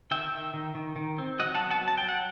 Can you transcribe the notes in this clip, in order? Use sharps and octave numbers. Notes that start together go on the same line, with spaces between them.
D#3 E5 G5
D#3
D#3
D#3
D#3
C4
F#3 D#5 F#5
F#5 A5
B3
F#5 A5
F#3
A5
G5
F#3
F#5